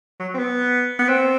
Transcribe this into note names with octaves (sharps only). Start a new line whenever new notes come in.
F#3
C4
B3
B3
C4